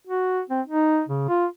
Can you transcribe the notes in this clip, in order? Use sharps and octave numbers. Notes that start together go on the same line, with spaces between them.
F#4
C4
D#4
C#3
F4